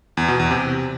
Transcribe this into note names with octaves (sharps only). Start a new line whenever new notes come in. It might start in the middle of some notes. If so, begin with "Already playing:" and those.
E2
B2
E2
C3